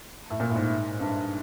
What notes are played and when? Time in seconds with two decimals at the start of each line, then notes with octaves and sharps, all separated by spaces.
0.30 A2
0.40 A#2
0.50 A2
0.55 G#2
1.00 G2